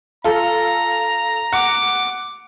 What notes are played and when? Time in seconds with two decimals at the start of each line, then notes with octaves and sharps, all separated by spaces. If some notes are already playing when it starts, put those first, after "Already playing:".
0.24 F4 A4 A#5
1.53 F#5 D6